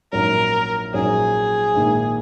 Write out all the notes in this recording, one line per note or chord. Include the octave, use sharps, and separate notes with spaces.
A#1 G#2 F#3 C#4 A#4
A#1 G#2 F#3 C#4 G#4
A#1 G#2 D#3 A#3